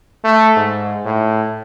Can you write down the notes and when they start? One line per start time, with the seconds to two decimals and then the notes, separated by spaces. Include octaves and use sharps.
0.24 A3
0.57 G#2
1.05 A2